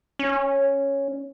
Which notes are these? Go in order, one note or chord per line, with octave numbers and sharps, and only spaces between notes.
C#4